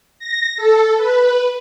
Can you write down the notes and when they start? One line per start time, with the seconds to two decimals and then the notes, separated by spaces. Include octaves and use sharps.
0.19 A#6
0.57 A4
0.97 B4